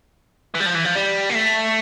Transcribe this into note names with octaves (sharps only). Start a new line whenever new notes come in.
E3
G3
F3
E3
F3
G3
A#3
A3